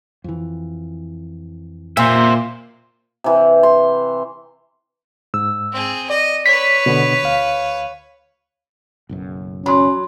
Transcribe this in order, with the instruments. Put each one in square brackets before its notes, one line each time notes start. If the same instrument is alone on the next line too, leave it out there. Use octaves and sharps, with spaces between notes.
[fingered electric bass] F2 E3
[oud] A#2 [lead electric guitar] C5 E5
[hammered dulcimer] C3 E3
C6
[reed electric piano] G#2 E6
[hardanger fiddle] C4 G#4
[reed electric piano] D5 [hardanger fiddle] D#5
[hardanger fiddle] B4 C#5 [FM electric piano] B6
[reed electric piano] B2 D3 B3
D2 F5
[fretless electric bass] F#1 B1 F#2
[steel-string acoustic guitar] F#3 [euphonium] C#4 [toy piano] B5 C6